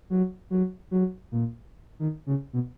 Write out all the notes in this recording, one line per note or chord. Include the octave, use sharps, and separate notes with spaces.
F#3
F#3
F#3
A#2
D#3
C#3
B2